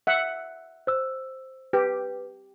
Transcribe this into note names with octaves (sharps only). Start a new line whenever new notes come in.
E5 F#5
C5 E6
G4 B4